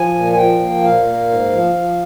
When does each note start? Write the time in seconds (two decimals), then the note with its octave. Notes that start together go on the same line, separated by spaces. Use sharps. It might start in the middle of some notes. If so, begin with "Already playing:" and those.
Already playing: F3 G#5
0.15 A#2
0.32 G#5
0.37 F3 G5
0.60 A#3
0.83 A#2 F5
1.06 A#3
1.29 G#2
1.52 F3
1.75 F3